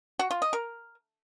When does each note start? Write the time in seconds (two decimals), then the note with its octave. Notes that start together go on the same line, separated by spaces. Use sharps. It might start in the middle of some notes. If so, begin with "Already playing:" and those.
0.19 F#4
0.31 F4
0.42 D#5
0.53 A#4